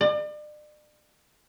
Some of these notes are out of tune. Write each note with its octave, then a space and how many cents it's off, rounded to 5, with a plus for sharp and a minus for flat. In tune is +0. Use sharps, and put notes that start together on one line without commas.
D5 +40